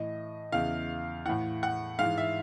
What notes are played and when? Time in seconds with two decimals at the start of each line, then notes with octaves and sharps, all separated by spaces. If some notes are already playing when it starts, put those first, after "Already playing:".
Already playing: A2 E3 D#5
0.52 E2 C#3 E3 F5
1.26 A2 E3 F#5
1.63 F#5
1.99 G#2 E3 F5
2.18 E5